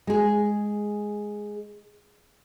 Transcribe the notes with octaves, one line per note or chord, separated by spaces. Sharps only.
G#3 G#4